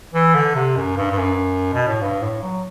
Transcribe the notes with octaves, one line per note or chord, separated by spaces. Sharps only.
E3
D3
C3
F#2
G2
G2
F#2
B2
A2
G2
A2
F#3